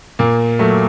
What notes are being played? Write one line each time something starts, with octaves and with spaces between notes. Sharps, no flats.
A#2 A#3
F#3 A3